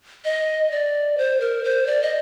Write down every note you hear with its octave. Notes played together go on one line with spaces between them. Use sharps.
D#5
D5
C5
A#4
C5
D5
D#5